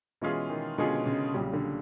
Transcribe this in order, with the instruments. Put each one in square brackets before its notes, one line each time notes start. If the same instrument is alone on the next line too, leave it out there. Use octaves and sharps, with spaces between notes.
[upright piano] B2 G#3 C#4 F4 G#4 [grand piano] E3
[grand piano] D#3
[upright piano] B2 G#3 C#4 F4 G#4 [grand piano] D3
[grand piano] C#3
[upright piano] B1 A#2 G3 [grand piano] C#3
[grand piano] D3